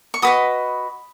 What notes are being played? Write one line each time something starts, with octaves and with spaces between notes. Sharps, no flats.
C#6
F#4 B4 D#5 B5 D#6